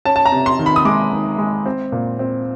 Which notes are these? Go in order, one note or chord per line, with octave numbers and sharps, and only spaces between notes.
C#4 A5
A5
A#5
C3
C6
D#3
B5
D#6
G#3 D6
D#3
G#3
C4
A#2
C4